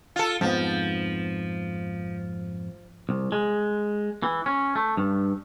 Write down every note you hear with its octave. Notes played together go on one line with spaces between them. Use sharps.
F4 A4
F2 G#2 F3 B3
C2
G#3
E3
C#4
A3
G2